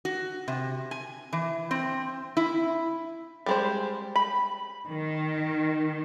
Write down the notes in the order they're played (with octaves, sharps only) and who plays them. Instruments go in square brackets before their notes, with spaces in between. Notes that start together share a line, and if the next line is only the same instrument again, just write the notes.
[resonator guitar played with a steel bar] F#4
C3
G#5
E3
C4
E4
[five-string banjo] G3 G#3 C5
B5
[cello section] D#3